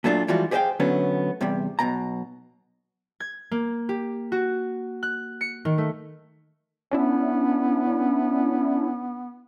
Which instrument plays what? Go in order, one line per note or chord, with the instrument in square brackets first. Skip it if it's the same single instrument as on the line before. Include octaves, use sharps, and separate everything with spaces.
[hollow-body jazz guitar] A#2 F#3 A3 D4 F4
E3 F3 G3 G#3 F4 F#4
G4 G#4 C5 D#5 F5 G5
D3 F#3 A3 B3 C#4
E2 C3 G3
B1 F2 B2 A#5
[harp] G#6
A#3
G4
F#4
F#6
C#7
D#3
A3
[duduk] B3 [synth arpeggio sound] C#4 D4 E4